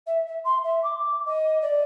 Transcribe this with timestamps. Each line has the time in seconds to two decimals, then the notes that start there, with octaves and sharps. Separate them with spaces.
0.06 E5
0.26 E5
0.44 C6
0.64 E5
0.83 D6
1.25 D#5
1.61 D5